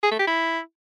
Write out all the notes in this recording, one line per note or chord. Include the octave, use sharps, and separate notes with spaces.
G#4
A3
G4
E4